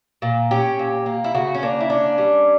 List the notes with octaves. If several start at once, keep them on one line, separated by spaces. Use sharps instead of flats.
A#2
C#4 G4
A#2
A#3
E4
C#3 F#4
C#4
A#3 D4
E4
C#4 D4
G3